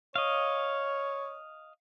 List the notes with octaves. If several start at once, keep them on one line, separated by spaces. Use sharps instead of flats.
C#5 D#5 F5